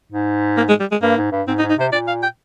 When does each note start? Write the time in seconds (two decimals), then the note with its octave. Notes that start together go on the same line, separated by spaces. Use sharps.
0.12 G#2
0.57 A#3
0.69 G#3
0.80 G3
0.91 G#3
1.02 G2 A#3
1.17 G#2
1.32 G2
1.48 G#2 C4
1.59 D#4
1.62 G#2
1.70 D#4
1.78 C3 C5
1.92 A#2 D5
2.07 F5
2.23 G5